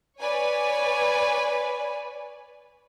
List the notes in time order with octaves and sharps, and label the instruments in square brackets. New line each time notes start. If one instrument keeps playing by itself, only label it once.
[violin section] B4 C#5 D5 G#5